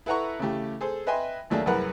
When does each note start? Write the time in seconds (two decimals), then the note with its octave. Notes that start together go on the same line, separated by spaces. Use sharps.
0.06 E4 A4 B4 F#5 A#5 C#6
0.39 C#3 E3 A3 G4
0.81 G#4 A4 C5
1.07 B4 D#5 E5 G5 G#5 C6
1.50 D#2 F#3 A3 A#3 D4 G#4
1.66 C2 F#2 G#4 A#4 B4 F#5